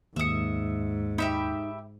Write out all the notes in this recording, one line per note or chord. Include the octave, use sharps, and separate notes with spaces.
D#2 G#2 E5 D#6 C#7
D#4 G4 E5 B5